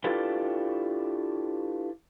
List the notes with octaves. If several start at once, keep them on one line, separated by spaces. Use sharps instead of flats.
D4 E4 F4 G4 A4 B4